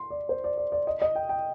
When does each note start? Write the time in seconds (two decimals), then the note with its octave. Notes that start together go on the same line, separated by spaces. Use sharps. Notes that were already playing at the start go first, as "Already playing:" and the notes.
Already playing: C6
0.10 D5
0.29 C5
0.44 D5
0.57 D5
0.72 D5
0.87 D#5
1.02 D#5
1.15 G5
1.29 G5